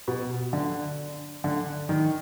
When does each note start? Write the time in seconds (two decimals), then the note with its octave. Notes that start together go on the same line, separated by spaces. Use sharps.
0.08 B2
0.53 D3
1.44 D3
1.89 D#3